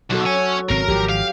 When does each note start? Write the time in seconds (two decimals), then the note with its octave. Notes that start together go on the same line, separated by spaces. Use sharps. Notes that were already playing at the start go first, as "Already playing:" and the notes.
0.11 B1 F#3 F#4 A4
0.26 C#5 G#5
0.70 G#1 C#3 C4 A#4
0.88 G#1 D#3 F3 G4
1.10 F5